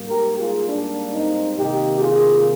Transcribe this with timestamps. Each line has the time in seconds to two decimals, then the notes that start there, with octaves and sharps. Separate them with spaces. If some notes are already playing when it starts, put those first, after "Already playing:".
Already playing: G#2 G3 A#3
0.09 G4 A#4
0.38 F4 G#4
0.68 D4
1.12 C4 D#4
1.56 C3 D#3 A#3 D#4 G4
2.01 F4 G#4